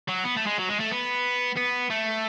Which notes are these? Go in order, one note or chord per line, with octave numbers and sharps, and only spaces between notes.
F#3
B3
A3
G#3
F#3
G#3
A3
B3
B3
A3